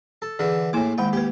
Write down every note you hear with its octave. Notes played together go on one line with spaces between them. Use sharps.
A4
D3 E3 E4 G#4
A2 A#3 E4 G#5 D6
D#3 G#3 F#5 G5
A#3 G4 B4